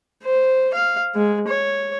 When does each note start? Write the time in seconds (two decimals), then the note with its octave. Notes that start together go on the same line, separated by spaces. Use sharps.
0.23 C5
0.74 F5
1.15 G#3
1.48 C#5